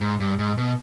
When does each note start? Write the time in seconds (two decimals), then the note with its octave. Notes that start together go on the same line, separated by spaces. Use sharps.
0.01 G#2
0.20 G2
0.39 G#2
0.58 B2